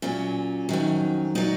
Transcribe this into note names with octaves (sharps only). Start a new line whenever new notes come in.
A#2 F#3 C#4
F2 D#3 F#3
A#2 F#3 D#4